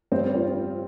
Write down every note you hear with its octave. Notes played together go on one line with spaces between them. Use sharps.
G2 G3 C4
C4 F4